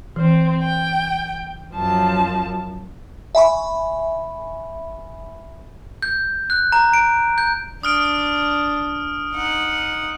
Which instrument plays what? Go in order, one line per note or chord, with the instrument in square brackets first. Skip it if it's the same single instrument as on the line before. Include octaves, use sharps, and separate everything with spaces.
[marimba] E3 [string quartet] C4 C5
[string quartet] G5
F#2 F3 A5
[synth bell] E5 G#5 B5 C#6
[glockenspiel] G6
F#6
A#5
D7
G6
[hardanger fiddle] D4 [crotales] D#6 F6 D7
[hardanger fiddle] D#4 F#5